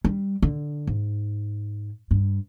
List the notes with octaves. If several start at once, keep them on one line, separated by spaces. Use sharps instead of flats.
G3
D3
G#2
G2